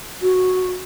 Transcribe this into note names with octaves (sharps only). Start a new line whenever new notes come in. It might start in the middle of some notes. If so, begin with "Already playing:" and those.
F#4